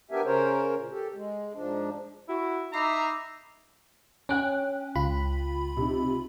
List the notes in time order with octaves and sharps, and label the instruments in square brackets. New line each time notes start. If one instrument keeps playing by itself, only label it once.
[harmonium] B3 D4 G4 A#4 E5 G#5
C#3 C#4 A#4 C5 C#5
A#2
G4 A4
G#3
G#2 F3 D4
[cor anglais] E4 [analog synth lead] F#4
[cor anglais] D#4 [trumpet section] E5 A#5 [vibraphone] B5 D6 [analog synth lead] C7
[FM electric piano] C#4 [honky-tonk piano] G5 F#6 D7
[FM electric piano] C#2 F4 B5
[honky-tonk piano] C3 D#4